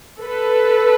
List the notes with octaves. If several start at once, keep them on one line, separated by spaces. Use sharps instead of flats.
A4 B4